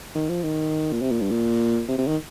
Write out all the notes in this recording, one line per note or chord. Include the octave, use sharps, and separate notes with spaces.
D#3
F3
D#3
A#2
C3
A#2
G2
A#2
C3
C3
D#3